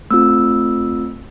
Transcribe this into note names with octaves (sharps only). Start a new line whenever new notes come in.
A3 C4 F4 E6